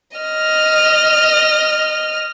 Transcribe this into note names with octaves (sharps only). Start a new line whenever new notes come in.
D#5 F6